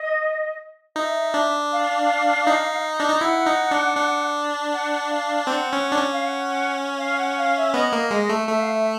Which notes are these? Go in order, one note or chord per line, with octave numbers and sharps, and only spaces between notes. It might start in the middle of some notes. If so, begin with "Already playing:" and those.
Already playing: D#5
D#4 E5
D4
F5
D#4
D4
D#4
E4 F#5
D#4
D4
D4
F#5
F5
C4 F#5
C#4
D4
C#4
F5
F#5
F5
F#5
F5
E5
B3 D#5
A#3
G#3
A3
A3 E5
F5
E5